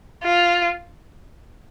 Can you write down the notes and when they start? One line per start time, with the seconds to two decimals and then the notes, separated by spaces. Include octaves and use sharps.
0.23 F4